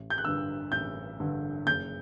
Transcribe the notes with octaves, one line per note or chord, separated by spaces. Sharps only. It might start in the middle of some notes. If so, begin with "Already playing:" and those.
Already playing: A1
G6
F#6
G2 D3 E6
A1 G6
G2 D3
F#1 G6